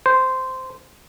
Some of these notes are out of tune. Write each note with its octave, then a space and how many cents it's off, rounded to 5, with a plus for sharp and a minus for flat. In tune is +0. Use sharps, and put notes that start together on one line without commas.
C5 -10